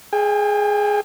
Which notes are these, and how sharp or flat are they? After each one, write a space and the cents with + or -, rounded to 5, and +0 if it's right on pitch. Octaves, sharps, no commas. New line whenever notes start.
G#4 +5 G5 +45